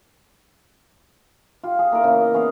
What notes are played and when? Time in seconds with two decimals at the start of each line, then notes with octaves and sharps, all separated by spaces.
1.63 F4 G4
1.79 G#4
1.92 A#3 E4 A#4
2.04 C#3 E3
2.21 D#5
2.34 B3 C#4 G#4 F5